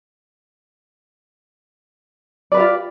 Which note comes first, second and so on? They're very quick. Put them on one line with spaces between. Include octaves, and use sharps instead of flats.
D5 B4 G4 F4